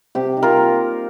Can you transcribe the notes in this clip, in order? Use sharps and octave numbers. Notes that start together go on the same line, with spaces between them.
C3 G4
D#4
F4 A#4
A#3